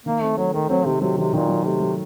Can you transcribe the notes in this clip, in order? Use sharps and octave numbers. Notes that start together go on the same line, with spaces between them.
D#3 A#3
A3 C4
F#3 A3
D#3 A3
F#3 C4
C3 D#3
C3 F#3
C3 D#3
A#2 D#3
F#3
C3 A3
F#3